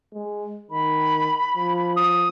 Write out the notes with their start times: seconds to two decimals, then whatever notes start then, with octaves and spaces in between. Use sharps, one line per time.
0.14 G#3
0.71 D#3 B5
1.56 F3
1.97 D#6